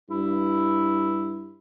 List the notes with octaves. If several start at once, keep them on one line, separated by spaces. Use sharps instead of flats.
G2 E4